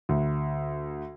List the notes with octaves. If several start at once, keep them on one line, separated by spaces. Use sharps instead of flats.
D2